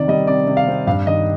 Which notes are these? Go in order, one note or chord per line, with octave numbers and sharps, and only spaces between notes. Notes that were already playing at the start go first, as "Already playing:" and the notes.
Already playing: C3 D#3 D5
G3 D#5
C3 D5
C3
F5
C4
G2 F5
D#3 D#5